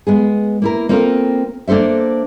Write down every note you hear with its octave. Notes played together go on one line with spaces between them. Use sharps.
G#3 B3 G#4
A#3 E4 A#4
A#3 C4 F4 A4 A#4
A#3 D4 A4 C5 E5